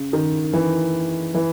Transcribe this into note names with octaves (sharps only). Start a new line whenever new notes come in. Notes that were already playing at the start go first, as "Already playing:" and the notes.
Already playing: C#3
D#3
E3
E3